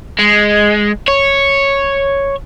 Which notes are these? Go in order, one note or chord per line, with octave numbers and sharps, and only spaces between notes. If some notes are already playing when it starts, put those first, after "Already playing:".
G#3
C#5